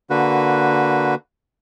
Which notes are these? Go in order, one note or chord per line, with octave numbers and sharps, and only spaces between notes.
D3 A#3 F#4 B4